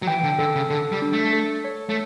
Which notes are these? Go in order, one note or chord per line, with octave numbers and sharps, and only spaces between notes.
F#3
E3 G5
D3
D3 A4
C#3
D3 A4
G3
D4
A3
A4
C#5
A3